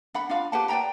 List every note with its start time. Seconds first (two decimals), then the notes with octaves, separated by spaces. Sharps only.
0.14 D4 F#5 B5
0.29 D4 F4 F5
0.52 G4 B4 F#5 A5
0.69 B4 D5 G5 A#5